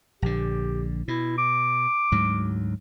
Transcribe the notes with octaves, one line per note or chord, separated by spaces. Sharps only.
A#1 D3 G4
B2 E4
D6
D2 G#2 F#3